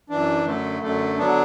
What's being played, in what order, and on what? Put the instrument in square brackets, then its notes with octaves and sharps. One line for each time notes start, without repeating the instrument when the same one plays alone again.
[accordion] F#2 E3 D4
F#2 D3 A3
F#2 D3 A3
D3 F#3 B3 D4